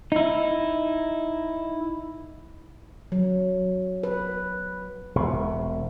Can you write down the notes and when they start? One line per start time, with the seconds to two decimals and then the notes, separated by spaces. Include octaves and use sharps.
0.12 D#4 E4
3.12 F#3
4.03 B4
5.15 E1 C3